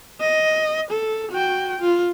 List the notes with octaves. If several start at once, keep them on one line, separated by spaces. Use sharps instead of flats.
D#5
A4
F#4 G5
F4